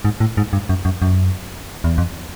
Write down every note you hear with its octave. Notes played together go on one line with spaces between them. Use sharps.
G#2
A2
G#2
G2
F#2
F#2
F#2
E2
F2